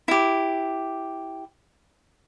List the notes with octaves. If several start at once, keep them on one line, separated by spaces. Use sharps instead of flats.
E4 G4